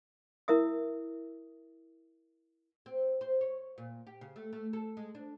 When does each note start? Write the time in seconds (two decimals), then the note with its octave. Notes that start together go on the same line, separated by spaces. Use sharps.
0.48 E4 A#4 E5 D#6
2.86 C4
3.21 C5
3.41 C#5
3.78 A#2
4.07 G4
4.21 C#3
4.36 A3
4.53 A3
4.73 A4
4.97 G#3
5.15 D4